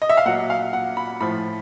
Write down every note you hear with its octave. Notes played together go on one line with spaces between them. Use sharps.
D#5
E5
F5
A#2 F#3 F#5
F5
F#5
B5
A2 F3 B5